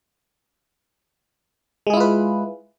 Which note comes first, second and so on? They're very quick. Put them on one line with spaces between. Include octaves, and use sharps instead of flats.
G#3 G#4 E4 F4 B4